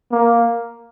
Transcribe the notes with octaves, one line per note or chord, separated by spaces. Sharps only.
A#3